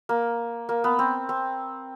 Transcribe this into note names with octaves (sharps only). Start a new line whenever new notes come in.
A#3
A#3
B3
C4
C4